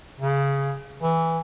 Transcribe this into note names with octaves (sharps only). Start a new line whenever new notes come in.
C#3
E3